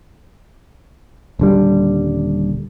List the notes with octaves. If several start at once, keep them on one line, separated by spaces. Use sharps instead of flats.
D#1 D3 G3